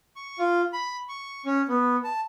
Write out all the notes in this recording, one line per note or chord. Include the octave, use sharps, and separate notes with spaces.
C#6
F4
B5
C#6
C#4
B3
A5